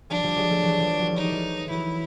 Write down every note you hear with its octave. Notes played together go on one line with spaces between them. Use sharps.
F3 G3 D4
F3 G3
F#3 G#3
G3 A3
E3 F#3
F3 G3
F#3
G3
F#3 D#4
G3
E3 F#3
E3 F#3 E4